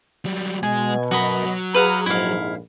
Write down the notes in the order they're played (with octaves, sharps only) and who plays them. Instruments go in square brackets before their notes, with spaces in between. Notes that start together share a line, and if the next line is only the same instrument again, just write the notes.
[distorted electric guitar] F#3 G3
[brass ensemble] B2 [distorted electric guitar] G#3 [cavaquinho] G#5
[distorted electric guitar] F#3 A#4 [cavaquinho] F#4 D#5 B5
[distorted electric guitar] F#3
[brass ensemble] G#4 A#5 [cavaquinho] B4 F5 F#5
[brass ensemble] A#1 F2 G#2 [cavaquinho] E4 F5